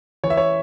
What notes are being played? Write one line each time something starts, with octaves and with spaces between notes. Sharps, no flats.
E3 C#5
E5
C#5